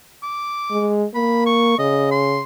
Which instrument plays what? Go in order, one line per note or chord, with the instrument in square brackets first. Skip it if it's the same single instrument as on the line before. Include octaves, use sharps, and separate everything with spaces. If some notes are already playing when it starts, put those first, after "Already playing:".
[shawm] D6
[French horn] G#3
[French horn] A#3 [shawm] B5
[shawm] C#6
[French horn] C#3 [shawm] D#5
[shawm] C6